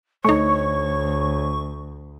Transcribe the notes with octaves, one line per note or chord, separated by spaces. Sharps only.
D2 A3 D#4 C#5 C#6